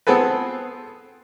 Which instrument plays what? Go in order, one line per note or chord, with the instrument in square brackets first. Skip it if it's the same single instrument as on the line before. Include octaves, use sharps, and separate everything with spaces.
[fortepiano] B3 C4 G#4 A4 B4